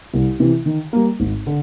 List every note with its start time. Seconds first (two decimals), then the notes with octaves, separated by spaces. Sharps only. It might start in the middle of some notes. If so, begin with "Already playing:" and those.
0.14 C2
0.40 C3 E3
0.66 D#3
0.93 G3 A#3
1.20 G#1
1.47 D3